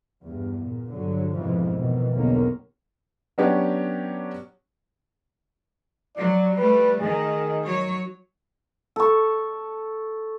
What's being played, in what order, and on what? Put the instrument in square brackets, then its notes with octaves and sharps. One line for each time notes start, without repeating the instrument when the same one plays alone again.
[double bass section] E2 G2
A#2
G2 D3 F#3
C2 F2 G#2 B2 E3 F3
B2 D#3 E3
B1 E2 D3 D#3 A#3 C#4
[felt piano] F#3 B3 C#4 D4 G4
[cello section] F#3 [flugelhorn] D5
[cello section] G3 A3 [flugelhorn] B4
[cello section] D#3 [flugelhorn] G#4
[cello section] F#3 C#5
[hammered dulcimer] A4 C#6